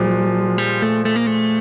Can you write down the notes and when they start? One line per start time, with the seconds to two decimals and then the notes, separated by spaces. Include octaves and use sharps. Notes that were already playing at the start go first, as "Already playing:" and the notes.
Already playing: A#2 F3 F#3 G#3
0.58 G3
0.82 A3
1.05 A3
1.16 A#3
1.27 A3